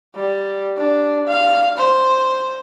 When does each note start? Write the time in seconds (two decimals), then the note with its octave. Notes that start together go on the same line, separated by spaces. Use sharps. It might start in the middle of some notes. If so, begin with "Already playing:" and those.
0.15 G3
0.77 D4
1.27 F5
1.78 C5